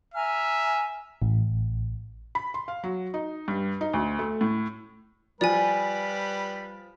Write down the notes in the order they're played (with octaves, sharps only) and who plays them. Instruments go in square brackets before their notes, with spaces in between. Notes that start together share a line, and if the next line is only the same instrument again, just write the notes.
[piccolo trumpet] E5 [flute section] G#5 A#5 F6
[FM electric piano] A1
[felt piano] B5
C6
F5
F#3
D#4
G2
D#4
D2
A3
A2
[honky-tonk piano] F3 [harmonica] G3 B4 [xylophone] D5 G#5